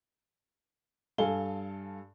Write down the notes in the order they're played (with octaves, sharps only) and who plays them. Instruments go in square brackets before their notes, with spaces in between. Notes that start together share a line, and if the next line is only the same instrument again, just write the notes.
[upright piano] G2 A4 F5 G#5 A5 G7